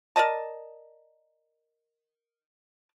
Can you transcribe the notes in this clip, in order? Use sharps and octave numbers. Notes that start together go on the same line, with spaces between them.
A#4 D5 D#5 A5